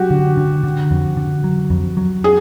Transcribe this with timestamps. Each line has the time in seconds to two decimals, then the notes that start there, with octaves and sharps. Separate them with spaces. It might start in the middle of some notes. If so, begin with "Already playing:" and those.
Already playing: F#3 F#4 G4
0.10 D3
0.37 D3
0.64 D3
0.91 F2
1.17 D3
1.44 F#3
1.70 F2
1.97 F#3
2.24 G#4